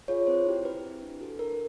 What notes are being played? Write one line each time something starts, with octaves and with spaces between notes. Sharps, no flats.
F4 G#4 C#5
C4 C5
E4 G4
C4 B4
E4 G4
D4
F#4 A4
D4 A#4